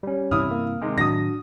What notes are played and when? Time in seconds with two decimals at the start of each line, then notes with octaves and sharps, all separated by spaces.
0.03 G3 C#4
0.31 G2 C3 E3 E4 D#6 F6
0.51 A#3
0.82 C3 D#3 G#3
0.98 A2 D#3 F#3 D4 F#4 D#6 A#6